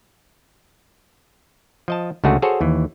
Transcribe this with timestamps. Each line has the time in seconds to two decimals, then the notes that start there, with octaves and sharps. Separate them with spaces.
1.88 F3 D#5 A5
2.24 C#2 D3 G#3 A3 F#4 G#4
2.42 F#4 G#4 A4 C5 C#5
2.61 D#2 E3